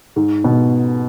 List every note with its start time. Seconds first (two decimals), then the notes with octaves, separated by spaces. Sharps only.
0.16 G#2
0.44 B2